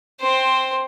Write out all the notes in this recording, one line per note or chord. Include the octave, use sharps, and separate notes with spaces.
C4 C5